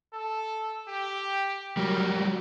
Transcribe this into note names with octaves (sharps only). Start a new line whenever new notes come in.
A4
G4
F#3 G3 A#4